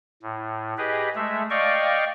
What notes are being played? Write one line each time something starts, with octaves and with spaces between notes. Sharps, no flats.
A2
G4 G#4 B4 D#5
G#3 A3 E5
D5 D#5 F5 G5 C#6